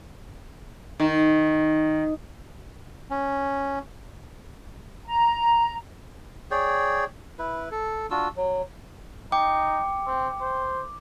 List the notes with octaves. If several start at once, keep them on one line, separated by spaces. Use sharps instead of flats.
D#3
C#4
A#5
G#4 C#5 D5 G5
E4 B4
A4
D4 F4 F#4 E6
F#3
D#4 G5 D6
C4
C5